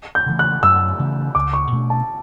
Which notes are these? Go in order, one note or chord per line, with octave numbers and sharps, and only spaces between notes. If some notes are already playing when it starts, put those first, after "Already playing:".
G6
C#3 E3 A3
F#6
F#2 E6
C#3 E3 A3
C#2 D6
C#6
B2 A3 D4
A5